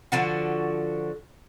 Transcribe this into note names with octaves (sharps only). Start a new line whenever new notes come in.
D3 F3 F#4